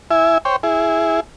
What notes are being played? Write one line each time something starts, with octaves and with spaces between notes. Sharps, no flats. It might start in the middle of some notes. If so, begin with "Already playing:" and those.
E4 E5 G#5
C5 C#5 G5
E4 G#4